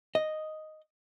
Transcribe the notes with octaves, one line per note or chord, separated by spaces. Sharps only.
D#5